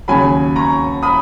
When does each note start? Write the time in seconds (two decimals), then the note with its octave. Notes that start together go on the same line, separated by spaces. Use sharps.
0.08 D#2 C#3 F#3 G#5 B5
0.56 A#5 C#6
1.03 B5 D#6